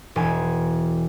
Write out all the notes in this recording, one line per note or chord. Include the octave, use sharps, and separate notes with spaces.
E1 G#5